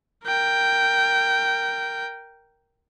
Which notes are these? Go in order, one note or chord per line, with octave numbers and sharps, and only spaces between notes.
A#4 G5